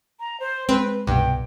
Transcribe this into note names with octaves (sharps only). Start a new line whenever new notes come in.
A#5
C5
G#3 C4 B4
C2 G2 B2 G5